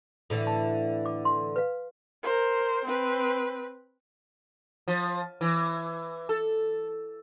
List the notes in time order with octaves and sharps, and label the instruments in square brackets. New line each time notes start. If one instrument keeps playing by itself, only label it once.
[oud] A2 D3 E3
[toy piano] A5
D6
C6
B4 F5
[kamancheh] A#4 C5
C4 B4
[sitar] F3
E3
A4